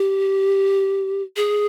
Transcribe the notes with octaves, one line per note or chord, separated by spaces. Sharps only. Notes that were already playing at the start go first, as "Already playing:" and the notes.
Already playing: G4
G#4